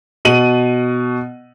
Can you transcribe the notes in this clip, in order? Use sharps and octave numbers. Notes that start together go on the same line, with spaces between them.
B2 D#7 F#7